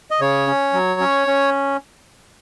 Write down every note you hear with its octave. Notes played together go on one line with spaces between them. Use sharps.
D#5
C#3 C#5
C#4
F#3
C#4
C#4